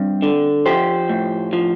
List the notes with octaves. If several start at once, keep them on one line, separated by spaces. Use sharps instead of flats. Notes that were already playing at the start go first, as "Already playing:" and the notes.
Already playing: G2 C4
D3
F3 G4 C5
A2
F3